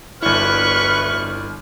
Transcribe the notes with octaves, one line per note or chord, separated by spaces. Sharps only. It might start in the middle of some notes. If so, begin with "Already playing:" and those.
G1 D2 E4 B4 D5 C#6 F6 F#6